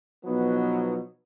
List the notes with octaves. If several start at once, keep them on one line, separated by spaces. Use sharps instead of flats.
B2 F3 F#3 B3 D#4